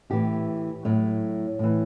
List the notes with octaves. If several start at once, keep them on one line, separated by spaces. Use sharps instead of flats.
A2 E3 G4
A2 F#3 C#5
A2 E3